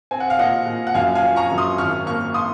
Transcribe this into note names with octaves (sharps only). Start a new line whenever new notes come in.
C4 G#5
F#5
F5
A#2 D#5 F#5
A#2
F#5
F#2 F5 G#5
F5 G#5
F3
A#5 C#6
F#2
C6 D#6
G#1 C#6 F6
A#3 C#6 F6
C6 D#6